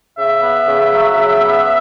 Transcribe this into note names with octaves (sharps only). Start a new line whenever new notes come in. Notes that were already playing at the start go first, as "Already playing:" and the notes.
C#3 E5
B3
C#3
F#3
C#3
B3